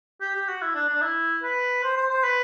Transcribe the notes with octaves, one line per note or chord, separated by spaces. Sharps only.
G4
G4
F#4
E4
D4
D4
E4
B4
C5
C5
C5
B4